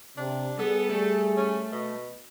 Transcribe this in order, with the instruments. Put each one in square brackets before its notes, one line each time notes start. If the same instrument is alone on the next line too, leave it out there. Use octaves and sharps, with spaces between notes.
[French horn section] C3 [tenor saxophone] D4
[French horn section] G3 G#4 [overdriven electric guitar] B3 [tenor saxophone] A4
[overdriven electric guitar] A3
[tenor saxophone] C#4
B2